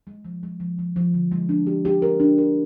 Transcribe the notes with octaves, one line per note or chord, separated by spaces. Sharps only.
G#3
F3
G#3
F3
F3
F3
D3
G#3
D4
G4
G4
A#4
D4
A#4